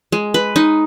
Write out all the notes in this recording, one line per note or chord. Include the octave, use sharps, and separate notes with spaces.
G#3
B4
D#4